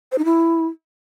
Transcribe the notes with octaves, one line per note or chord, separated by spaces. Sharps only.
C5
D#4
E4